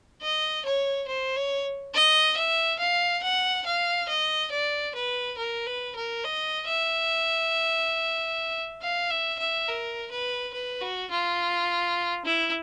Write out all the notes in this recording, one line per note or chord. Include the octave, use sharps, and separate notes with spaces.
D#5
C#5
C5
C#5
D#5
E5
F5
F#5
F5
D#5
D5
B4
A#4
B4
A#4
D#5
E5
F5
E5
E5
A#4
B4
B4
F#4
F4
E4